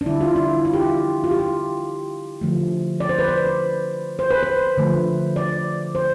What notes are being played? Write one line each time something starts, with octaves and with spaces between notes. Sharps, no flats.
D4
D3 G3 E4
F4
E4
F4
G4
F4
F4
G4
F4
D3 F3 A3
D5
C5
B4
C5
C5
B4
C5
D3 F3 A3
D5
C5